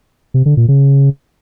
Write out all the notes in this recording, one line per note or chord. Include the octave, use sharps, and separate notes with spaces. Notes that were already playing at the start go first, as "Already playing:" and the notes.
C3
D3
A#2
C#3